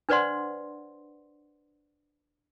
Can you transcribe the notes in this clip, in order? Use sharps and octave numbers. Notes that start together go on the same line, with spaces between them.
D4 B4 C5 D5 F#5 C6